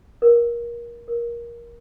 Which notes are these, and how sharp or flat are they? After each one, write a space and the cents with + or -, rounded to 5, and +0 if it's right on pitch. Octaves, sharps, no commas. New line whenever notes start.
A#4 +25
A#4 +20